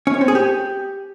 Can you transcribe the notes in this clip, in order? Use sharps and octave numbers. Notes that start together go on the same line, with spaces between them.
C#4
C#5
C4
G#4
G4